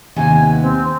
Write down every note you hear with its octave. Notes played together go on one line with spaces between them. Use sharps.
D#2 C3 B3 G#5
C4